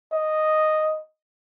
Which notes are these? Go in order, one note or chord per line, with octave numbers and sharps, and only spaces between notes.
D#5